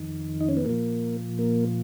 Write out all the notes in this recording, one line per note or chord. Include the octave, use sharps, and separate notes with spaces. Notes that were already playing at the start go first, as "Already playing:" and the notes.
Already playing: F2 D#3
D#4
C#4
B3
A#2 F3 A#3
A#3